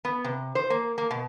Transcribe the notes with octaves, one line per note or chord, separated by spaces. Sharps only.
B3
C3
C5
A#3
A#3
B2